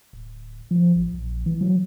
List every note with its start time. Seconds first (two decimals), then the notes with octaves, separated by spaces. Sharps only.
0.13 D1
0.71 F3
0.96 A1
1.14 A#1
1.46 E3
1.61 F#3